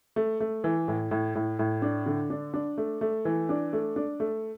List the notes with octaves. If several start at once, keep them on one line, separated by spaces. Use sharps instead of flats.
A3
A3
E3
A2
A2
A2
A2
D4
D3
D4
D4
A3
A3
E3
D4
A3
D4
A3